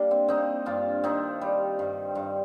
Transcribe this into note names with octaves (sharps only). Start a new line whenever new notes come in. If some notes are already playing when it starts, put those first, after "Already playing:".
Already playing: G3 A#3 D4
C4
A#3 C4 D#4
G2 D4 F4
D#3 C4 D#4
G3
G2
G2